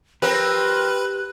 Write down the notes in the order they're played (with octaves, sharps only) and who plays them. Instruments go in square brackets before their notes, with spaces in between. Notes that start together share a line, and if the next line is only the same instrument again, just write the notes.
[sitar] F3 C4 A#4 [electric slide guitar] G4 [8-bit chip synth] B4 [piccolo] F#6